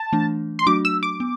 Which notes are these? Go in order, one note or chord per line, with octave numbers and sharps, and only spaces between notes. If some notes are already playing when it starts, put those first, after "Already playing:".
Already playing: A5
E3 A3 D4
C6
F#3 A3 D4 F#4 D6
E6
D6
B3